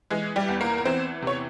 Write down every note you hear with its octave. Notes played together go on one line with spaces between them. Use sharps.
E3 G#3 G#4
G3 G4
E2
A#3 A#4
A#4
E3 C4 C5
C3 C#5